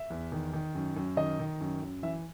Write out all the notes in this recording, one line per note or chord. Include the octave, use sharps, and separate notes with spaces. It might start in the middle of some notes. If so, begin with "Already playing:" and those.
Already playing: E5
E2
D#3
D#3
F#2
F#2
D#3 D#5
D#3
F#2
F#2
E3 E5